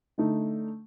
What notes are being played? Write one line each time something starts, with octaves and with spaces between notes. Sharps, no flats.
D3 A3 D#4